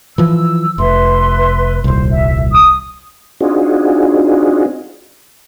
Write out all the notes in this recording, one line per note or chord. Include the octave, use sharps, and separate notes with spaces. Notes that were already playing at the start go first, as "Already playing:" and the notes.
E3 F3 E6
F1 B4 E5 C6
D#1 C2 C5
E5
D#6
C4 D4 D#4 F4 F#4 G#4